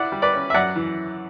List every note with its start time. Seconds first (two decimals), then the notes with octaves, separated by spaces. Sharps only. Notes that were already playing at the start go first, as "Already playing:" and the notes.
Already playing: E4 D5 F#5
0.12 G3
0.22 B4 D5
0.33 C#4
0.50 E5
0.54 F#2 D5 F#5
0.76 E3